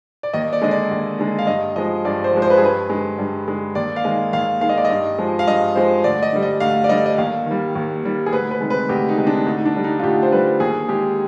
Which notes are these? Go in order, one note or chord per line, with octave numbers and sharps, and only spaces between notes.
D5
D#2 D#5
D5
D3 G#3 D#5
D5
D#2
D3 G#3
F5
G2 D#5
F3 G#3 D#5
G2 D5
C5
F3 G#3
C5
B4
G#4
G2 B4
D3 G#3
G2
D3 G#3
D#2 D5
F5
D#3 G#3 D#5
D#2 F5
D#3 G#3 F5
D#5
D5
D#5
G2
F3 G#3
F5
G2 D#5
F3 G#3 C5
D2 D5
D#5
D3 G3
D#5
D2 F5
D5
D3 G3 D#5
D#5
D#2 F5
D#3 G3
D#2
D#3 G3
G#4
D2 B4
B4
C3 D#3 G#3
B4
D2 G4
D#4
C3 D#3 G#3
D4
D2 D#4
D#4
D4
D3 G3
D#4
F4
D2 G4
C5
D3 G3 B4
D#2 G#4
D#3 G#3 G4